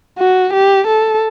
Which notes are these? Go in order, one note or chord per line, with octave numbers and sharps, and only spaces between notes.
F#4
G4
A4